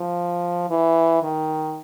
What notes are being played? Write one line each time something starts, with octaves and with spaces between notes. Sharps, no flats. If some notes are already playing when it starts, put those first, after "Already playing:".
Already playing: F3
E3
D#3